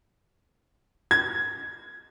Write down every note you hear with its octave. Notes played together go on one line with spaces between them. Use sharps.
G#6